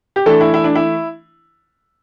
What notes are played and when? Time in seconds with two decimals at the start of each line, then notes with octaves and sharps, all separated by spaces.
0.16 G4
0.26 E3 A3 D4 A4
0.41 E4
0.54 E4
0.64 D4
0.75 E4